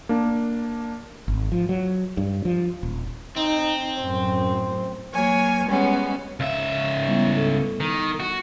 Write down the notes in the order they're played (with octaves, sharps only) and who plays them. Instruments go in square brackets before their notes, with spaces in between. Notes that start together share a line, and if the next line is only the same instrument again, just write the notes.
[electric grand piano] A#3 D4
[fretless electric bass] G#1
F3
F#3
G2
F3
D#1
[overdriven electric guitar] C4 [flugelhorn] D#4
[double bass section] F#2 A2 [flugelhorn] C5
[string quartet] F#3 A#3 C#5 G#5
G3 G#3 B3 C#4 F#4
[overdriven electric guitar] C#2 E5 [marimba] F5
[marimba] G3 B3 E4
A4
[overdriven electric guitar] D#3
F#4